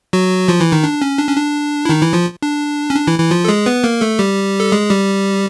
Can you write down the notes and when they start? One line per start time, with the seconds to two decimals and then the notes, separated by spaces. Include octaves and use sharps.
0.13 F#3 F#4
0.48 F3 F4
0.60 E3 E4
0.72 D#3 D#4
0.84 D4
1.02 C#4
1.19 D4
1.28 C#4
1.37 D4
1.85 E4
1.89 D#3 D#4
2.02 E3 E4
2.13 F3 F4
2.42 D4
2.90 C#4
2.96 D4
3.07 E3 E4
3.19 E3 E4
3.31 F3 F4
3.45 A4
3.48 G#3 G#4
3.66 B3 B4
3.84 A#3 A#4
4.01 A3 A4
4.19 G3 G4
4.60 A4
4.72 G#3 G#4
4.90 G3 G4